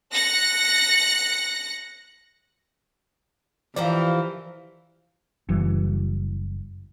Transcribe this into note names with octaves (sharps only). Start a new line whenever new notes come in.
F#6 A#6 C#7
E3 F3 G4 A#4 D5 F5
F#1 E3 G3